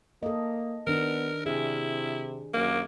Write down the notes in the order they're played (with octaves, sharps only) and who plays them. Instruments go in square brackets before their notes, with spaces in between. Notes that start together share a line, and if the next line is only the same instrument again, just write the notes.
[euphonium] A#3 [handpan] A4 D#5
[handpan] D#3 D4 [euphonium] B3 [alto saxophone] A#4
[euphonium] C3 [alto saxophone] E4 [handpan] G#4
[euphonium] F#2 [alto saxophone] A#3